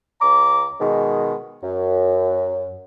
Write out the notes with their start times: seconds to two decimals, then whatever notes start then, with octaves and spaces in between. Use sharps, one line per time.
0.21 C#2 A#5 D6
0.80 B2 D#3 G#3
1.63 F#2